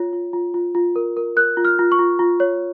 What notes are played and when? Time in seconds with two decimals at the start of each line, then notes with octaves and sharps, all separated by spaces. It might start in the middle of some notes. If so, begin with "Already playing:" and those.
Already playing: F4 C#5
0.13 F4
0.33 F4
0.54 F4
0.75 F4
0.96 A#4
1.17 A#4
1.37 A#4 F#6
1.57 F4
1.65 F6
1.79 F4
1.92 C#6
1.99 F4
2.19 F4
2.40 C#5